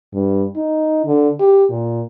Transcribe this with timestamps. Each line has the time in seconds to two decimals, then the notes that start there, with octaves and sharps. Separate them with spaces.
0.14 G2
0.56 D#4
1.06 D3
1.39 G4
1.70 A#2